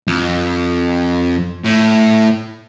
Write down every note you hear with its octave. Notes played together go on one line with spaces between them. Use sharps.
F2
A2